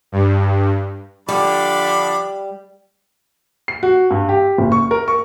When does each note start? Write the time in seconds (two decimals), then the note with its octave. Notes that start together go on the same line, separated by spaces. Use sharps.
0.12 G2
1.29 D3 F3 G3 D4 B5 D6
3.68 C7
3.83 F#4
4.11 G2
4.29 G4
4.58 F#1
4.72 C#6
4.91 A#4
5.08 C#6